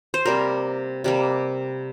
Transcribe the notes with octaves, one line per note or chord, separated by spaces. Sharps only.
C5
C3 G3 A#3 A#4
C3 G3 A#3